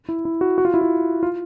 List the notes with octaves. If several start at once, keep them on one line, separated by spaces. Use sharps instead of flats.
E4
E4
F#4
F#4
F4
E4
F4
F4